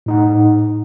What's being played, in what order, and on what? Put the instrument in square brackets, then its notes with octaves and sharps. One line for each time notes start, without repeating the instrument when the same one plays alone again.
[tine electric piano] A2 D#4 F#5